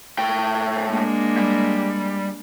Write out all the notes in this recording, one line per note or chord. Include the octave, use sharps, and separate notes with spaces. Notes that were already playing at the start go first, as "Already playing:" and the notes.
A2 G5
G#3 A#3 D4
G3